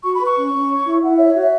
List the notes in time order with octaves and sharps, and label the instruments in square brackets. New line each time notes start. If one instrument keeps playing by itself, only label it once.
[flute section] F#4 C#6
B5
B4 C#6
C#4
C#4
C#5
E4
E4 F#5
C#5 E5
C#5
F#4
E5